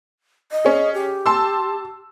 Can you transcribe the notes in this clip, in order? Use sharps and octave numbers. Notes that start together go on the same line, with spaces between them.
D#5
C#4 G#4
G4
A5 C6 E6